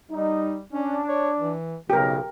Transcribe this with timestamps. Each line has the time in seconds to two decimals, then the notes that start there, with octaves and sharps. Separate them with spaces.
0.11 G3 D#4
0.73 C#4 D4
1.08 C#5
1.38 E3
1.90 B1 C#3 G4 A#4